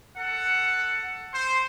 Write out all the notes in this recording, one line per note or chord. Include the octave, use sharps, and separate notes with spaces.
A4 F#5
C5